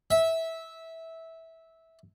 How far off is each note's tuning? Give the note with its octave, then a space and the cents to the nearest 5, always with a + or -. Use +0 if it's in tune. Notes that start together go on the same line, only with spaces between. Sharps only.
E5 -15